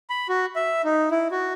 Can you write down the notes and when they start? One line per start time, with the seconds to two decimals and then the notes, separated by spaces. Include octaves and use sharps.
0.10 B5
0.29 F#4
0.56 E5
0.84 D#4
1.11 E4
1.31 F#4